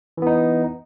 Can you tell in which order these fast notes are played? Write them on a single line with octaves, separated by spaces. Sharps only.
E3 B3 D#4